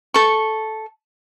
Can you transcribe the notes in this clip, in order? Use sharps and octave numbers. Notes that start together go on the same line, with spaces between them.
A4 C#6